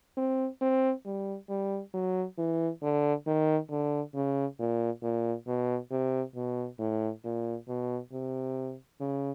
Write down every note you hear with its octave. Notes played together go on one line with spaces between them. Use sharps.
C4
C4
G3
G3
F#3
E3
D3
D#3
D3
C#3
A#2
A#2
B2
C3
B2
A2
A#2
B2
C3
C#3